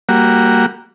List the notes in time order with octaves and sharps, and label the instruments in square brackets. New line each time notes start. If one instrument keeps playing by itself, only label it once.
[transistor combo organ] G3 A#3 F#4